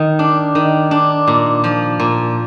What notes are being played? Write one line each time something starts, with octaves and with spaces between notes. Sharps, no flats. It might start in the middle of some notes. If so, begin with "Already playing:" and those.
Already playing: D#3
D4
D#3
D4
A#2
F3
A#2